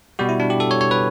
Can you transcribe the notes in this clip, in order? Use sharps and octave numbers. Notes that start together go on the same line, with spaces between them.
B2 G3 F#4
E4
D4
G4
A4
C#5
C#5
B4